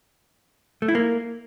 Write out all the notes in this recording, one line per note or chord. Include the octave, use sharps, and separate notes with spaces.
A3
E4
A#3